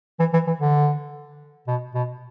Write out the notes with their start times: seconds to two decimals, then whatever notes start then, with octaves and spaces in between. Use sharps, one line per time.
0.20 E3
0.33 E3
0.47 E3
0.60 D3
1.67 B2
1.94 B2